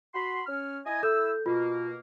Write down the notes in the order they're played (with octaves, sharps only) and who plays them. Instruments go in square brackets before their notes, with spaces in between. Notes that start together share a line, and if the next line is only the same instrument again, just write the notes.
[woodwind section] F#4 B5 C6
C#4 F6
E4 D#5 G#5
[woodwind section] E4 E6 [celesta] A4 G6
[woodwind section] B2 A#3 [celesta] F4